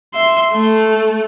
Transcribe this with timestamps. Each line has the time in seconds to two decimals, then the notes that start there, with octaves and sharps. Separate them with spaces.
0.14 E5 C6
0.54 A3